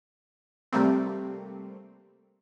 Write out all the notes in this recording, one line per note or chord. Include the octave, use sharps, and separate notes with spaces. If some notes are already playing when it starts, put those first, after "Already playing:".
C3 G3 A3 A#3 C4